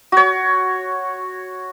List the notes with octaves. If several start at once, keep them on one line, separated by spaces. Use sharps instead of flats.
F#4 C#5